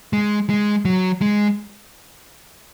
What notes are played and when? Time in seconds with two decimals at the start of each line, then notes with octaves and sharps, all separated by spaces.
0.13 G#3
0.49 G#3
0.85 F#3
1.21 G#3